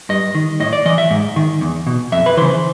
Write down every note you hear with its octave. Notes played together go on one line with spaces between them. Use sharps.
G2 D#5
D#3
A2 D#5
D5
E3 D#5
E5
G#2
D#3
E2
B2
F2 E5
B4
C#3 E3 C5